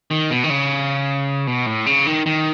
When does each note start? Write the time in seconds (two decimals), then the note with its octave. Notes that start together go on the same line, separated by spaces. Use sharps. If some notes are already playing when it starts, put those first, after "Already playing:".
0.11 D#3
0.31 B2
0.44 D#3
0.50 C#3
1.47 B2
1.66 A2
1.86 C#3
2.06 D#3
2.26 D#3